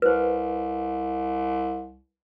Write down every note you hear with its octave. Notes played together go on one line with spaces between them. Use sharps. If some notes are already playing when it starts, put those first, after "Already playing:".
C2 B4 C5